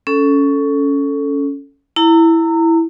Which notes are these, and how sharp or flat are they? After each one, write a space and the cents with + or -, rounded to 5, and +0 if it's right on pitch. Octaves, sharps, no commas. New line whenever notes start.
C#4 +15 A4 +0
E4 +0 A#5 -30